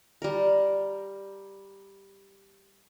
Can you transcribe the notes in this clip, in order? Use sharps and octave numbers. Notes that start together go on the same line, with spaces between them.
G3 A#4